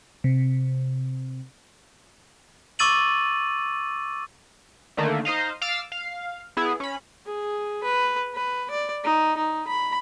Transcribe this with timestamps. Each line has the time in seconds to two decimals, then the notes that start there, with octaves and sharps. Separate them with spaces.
0.24 C3
2.79 C#6 D6 E6 A6 D#7 F#7
4.97 D3 D#3 A3 A#3
5.25 D#4 C5 D#5 F5
5.62 F5 D6 E6 F6 A6
5.92 F5
6.57 B3 E4 G#4
6.80 C#4 B5
7.26 G#4
7.84 B4
8.35 B4
8.71 D5
9.04 D#4
9.37 D#4
9.67 B5